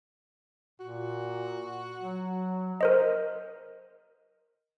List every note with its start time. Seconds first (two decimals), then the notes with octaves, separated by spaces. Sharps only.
0.80 A#2 F#4
2.01 F#3
2.81 A#4 C5 D#5